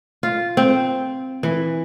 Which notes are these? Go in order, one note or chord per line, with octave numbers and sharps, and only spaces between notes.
F4
C4
E3